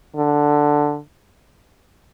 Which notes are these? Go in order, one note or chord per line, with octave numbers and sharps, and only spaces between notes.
D3